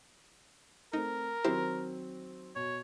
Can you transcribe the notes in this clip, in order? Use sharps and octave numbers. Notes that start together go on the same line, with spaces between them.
A3 C4 D#4 A#4
D#3 F#3 C4 E4 G4 C5
B2 C#5